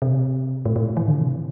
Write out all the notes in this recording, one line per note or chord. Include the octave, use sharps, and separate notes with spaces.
C3
A2
A2
E3
D3
C3